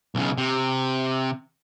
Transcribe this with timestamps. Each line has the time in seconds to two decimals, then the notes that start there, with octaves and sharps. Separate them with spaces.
0.15 B1 C#3
0.38 C3